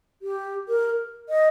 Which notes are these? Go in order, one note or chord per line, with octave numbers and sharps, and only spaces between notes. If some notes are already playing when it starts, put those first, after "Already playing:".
G4
A#4
D#5